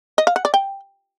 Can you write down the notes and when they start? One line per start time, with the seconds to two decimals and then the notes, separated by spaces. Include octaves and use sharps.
0.18 D#5
0.27 F5
0.36 F#5
0.45 D5
0.54 G5